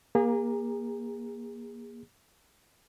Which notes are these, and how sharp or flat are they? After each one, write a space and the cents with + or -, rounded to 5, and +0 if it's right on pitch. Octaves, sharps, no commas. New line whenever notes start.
A#3 +25 G#4 -35 A#5 +0